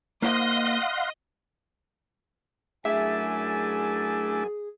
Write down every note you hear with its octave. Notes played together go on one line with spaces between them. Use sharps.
A#3 E4 C5 D#5 F5 F#5 C6
F#2 A3 D4 E4 G#4 E5 G#5